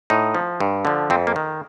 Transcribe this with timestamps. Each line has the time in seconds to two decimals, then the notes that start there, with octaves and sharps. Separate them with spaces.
0.10 A2 D#4
0.35 F3
0.60 G2
0.85 D3 F3
1.10 F2 C4
1.27 A#3
1.36 D#3